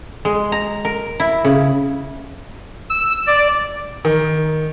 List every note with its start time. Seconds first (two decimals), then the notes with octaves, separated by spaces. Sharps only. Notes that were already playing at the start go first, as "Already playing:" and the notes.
0.25 G#3
0.52 A#5
0.85 A#4
1.20 E4
1.45 C#3
2.89 E6
3.27 D5
4.05 D#3